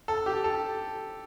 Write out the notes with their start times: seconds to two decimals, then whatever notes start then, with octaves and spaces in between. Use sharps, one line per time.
0.08 A4
0.26 G4
0.44 A4